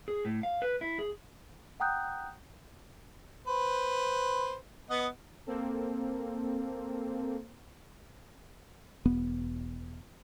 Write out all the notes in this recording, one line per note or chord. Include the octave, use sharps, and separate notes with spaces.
G#4
A2
F5
B4
E4
G#4
F#5 G5 A#5 D#6 F#6 G6
B4 C5
B3 D#5 F#5
A#3 C4 A4
E1 B3